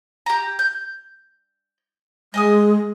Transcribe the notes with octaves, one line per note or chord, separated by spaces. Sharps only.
G4 A#5
G6
G#3 D#5 G#5 D#6